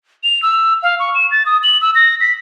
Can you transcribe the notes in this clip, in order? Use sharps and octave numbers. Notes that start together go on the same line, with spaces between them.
F7
E6
F5
C#6
E7
A6
D#6
F#7
E6
A#6
B6